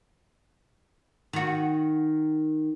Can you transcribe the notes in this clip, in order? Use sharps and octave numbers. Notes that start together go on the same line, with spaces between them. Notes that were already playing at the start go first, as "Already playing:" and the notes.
D#3 F#4